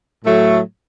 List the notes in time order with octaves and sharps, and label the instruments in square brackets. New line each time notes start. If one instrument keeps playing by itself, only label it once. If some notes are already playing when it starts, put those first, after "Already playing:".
[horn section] A2 F#3 A3